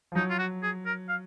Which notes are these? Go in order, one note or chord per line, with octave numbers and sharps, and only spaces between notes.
F3
F#3 D#4
F4
F#4
G#4
A#4
F5